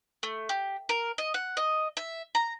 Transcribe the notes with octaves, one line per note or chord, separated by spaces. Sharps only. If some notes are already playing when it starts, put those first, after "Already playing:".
A3
G4
A#4
D#5
F#5
D#5
E5
A#5